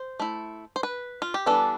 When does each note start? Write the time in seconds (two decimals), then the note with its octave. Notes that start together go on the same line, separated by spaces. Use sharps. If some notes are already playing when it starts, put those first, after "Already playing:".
Already playing: C5
0.20 A3 E4
0.76 C5
0.83 B4
1.22 F4
1.34 G4
1.46 E3 G3 B3 D4 A4